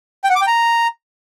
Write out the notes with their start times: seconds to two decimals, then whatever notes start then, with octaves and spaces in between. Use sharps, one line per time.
0.24 G5
0.30 F#5
0.36 D6
0.41 G5
0.47 A#5